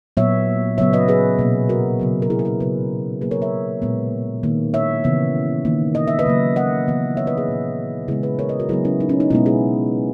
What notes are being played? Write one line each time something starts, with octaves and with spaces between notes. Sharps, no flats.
A#2 F#3 B3 C#5 E5
C#3 F#3 B3 C#5 E5
B4 D#5
G#4 B4
B2 A#3
F#4 A#4
C#3 F#3 B3
A#4
E4 G#4
A#4
E4 G#4
C#3 F#3 B3 G#4 B4
C#3 F#3 A#3 G#4 B4
A#4 C#5
C#5 E5
A#2 G#3 B3
D#3 A#3
C#5 E5
C#3 E3 B3
D#3 A#3
D#5
E5
B4 D#5
C#3 F#3 A#3
D#5 F#5
C#3 E3 B3
C#5 E5
B4 D#5
G#4 B4
A#2 A#3
C#3 G#3 B3 E4 G#4
G#4 B4
A#4 C#5
B4 D#5
F#4 A#4
C#3 F#3 B3 E4 G#4
C#4 E4
D#4
C#4
D#4
B2 G#3 B3 C#4 E4
E4 G#4